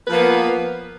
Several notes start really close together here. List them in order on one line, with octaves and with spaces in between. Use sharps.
B4 F3 A#3 B3